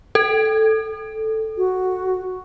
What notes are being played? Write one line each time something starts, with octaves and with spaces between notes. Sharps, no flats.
A4
F#4